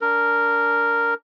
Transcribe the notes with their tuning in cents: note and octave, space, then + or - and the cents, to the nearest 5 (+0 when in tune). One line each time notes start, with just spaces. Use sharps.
D4 -25 A#4 -5